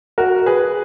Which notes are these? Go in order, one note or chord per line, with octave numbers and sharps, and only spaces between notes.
F#4 A#4
G#4 B4